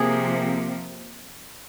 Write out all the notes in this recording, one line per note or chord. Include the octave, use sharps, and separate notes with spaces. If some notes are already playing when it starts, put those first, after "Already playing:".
Already playing: C3 F3 A#3 G#4